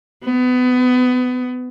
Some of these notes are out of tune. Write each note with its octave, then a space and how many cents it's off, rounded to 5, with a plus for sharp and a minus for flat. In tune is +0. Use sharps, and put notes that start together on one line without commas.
B3 +25